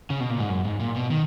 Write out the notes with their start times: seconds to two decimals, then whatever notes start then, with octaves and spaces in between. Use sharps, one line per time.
0.10 C#3
0.20 B2
0.30 A#2
0.40 G#2
0.50 F#2
0.65 G#2
0.80 A#2
0.96 B2
1.11 D#3